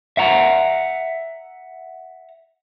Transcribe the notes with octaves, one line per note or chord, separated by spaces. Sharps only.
E5 F#5 A#5